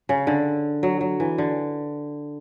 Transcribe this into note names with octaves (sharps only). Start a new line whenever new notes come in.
C#3
D3
F#3
F#3
E3
D3